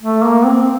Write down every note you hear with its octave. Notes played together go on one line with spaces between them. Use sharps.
A3
A#3
C4